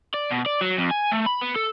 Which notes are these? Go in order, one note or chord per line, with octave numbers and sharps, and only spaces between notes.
D5
B2
D5
F#3
F2
G#5
A3
B5
B3
A4